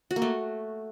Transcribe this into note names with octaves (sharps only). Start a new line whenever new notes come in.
F#4
A#3
A3